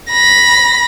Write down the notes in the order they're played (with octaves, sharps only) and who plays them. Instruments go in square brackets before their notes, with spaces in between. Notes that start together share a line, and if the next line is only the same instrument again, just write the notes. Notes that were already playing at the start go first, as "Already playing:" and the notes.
[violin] B5 A#6